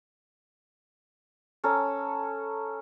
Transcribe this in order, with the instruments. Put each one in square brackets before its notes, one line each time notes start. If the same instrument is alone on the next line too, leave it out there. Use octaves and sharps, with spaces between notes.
[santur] C#4 A4 A#5